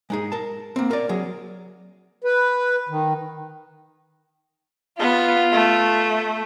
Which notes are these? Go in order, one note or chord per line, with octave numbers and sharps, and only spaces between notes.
G#3 D#4 G#4
A#4 A5
A#3 C4
A#4 D5
F#3 G#4
B4
D#3
B3 F4
A3